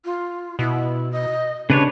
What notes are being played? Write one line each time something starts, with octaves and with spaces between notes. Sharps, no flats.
F4
B2 E4
D#5
C#3 D4 G4 B4 C#5